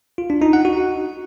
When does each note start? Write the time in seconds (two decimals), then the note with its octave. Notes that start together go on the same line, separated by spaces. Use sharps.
0.18 F4
0.30 D4
0.42 D#4
0.53 F#5
0.65 F#4